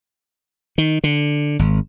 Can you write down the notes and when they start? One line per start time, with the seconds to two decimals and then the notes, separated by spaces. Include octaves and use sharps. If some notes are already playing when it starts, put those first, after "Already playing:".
0.78 D#3
1.04 D3
1.59 G#1